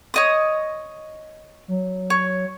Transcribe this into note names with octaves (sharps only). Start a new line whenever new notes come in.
C#5 D#5 D#6
F#3
C#5